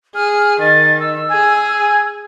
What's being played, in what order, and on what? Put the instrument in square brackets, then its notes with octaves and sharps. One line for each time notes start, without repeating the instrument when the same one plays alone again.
[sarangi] G#4 [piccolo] F6
[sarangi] D#3 [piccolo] A6
[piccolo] E6
[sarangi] G#4 [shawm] G#5